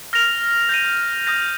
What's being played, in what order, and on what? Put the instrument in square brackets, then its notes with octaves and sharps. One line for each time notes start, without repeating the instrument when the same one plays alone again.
[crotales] F6 A#6 F7
G6 A#6 D#7
D#6 G6 A#6